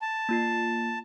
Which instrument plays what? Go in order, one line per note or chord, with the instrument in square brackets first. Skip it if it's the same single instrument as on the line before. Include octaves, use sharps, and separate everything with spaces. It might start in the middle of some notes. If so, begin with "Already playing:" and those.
[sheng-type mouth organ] A5
[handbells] A#3 F4 C7